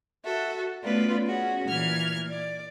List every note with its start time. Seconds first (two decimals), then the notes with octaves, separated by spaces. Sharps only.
0.24 F#4 A4 E5
0.84 A3 B3 C#4 F4 B4 D5
1.26 C#4 F#4 G#4
1.68 A#2 E3 F6 G#6
2.30 D5